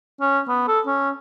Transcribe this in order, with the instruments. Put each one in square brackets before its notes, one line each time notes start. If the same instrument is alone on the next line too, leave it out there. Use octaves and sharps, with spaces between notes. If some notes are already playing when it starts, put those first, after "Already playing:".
[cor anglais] C#4
B3
A4
C#4